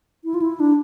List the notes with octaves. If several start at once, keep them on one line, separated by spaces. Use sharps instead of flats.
E4
F4
E4
D4